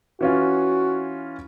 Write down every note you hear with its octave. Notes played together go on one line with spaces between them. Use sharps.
E3 C#4 F4 F#4